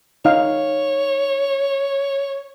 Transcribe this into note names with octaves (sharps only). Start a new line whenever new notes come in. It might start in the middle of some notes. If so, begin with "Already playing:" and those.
D#4 C#5 F5